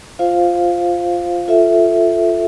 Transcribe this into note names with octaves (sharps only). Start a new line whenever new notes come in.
F4 C5 F5
F4 A4 E5